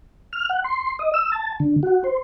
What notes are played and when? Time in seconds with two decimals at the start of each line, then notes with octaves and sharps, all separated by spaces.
0.33 F6
0.49 F#5
0.64 C6
0.99 D#5
1.14 E6
1.32 A5
1.60 D3
1.83 F#4
2.04 C5